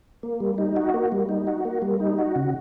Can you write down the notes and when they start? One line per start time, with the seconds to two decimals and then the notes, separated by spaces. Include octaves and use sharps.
0.23 A#3
0.40 G3
0.58 D#4
0.76 F#4
0.94 A#3
1.12 G3
1.29 D#4
1.47 F#4
1.65 A#3
1.82 G3
2.00 D#4
2.18 F#4
2.36 C#3